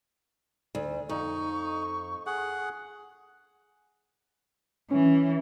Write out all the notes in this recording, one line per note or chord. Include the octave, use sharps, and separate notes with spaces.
D2
F2 D#4 C#6
G#4 F#5
E3 C#4